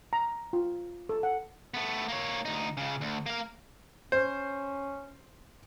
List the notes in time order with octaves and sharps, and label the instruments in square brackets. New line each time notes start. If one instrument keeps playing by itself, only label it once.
[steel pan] A#5
F4
A4
F#5
[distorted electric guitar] A3 B3
A#3 C#5
D2 D#4
C#2 C#3
D2
A#3 F5
[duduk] C#4 [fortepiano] C5